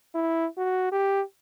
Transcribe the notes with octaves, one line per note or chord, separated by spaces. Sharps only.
E4
F#4
G4